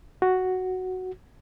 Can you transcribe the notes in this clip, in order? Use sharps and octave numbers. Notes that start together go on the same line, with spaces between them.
F#4